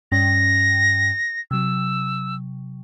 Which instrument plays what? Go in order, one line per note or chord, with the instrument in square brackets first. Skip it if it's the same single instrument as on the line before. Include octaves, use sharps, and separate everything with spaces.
[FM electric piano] G2 C#4 G5 [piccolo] A#6
[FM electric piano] C3 F#3 [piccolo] E6